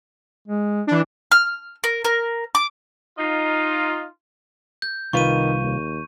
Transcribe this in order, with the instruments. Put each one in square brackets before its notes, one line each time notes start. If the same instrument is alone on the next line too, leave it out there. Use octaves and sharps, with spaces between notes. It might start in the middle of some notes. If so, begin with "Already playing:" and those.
[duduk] G#3
[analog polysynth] E3 D4
[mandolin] F6
A#4
A#4
D6
[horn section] D#4 F4
[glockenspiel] G6
[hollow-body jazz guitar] C2 F4 B4 [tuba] D#3 [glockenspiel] C#6 D#7
[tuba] D#2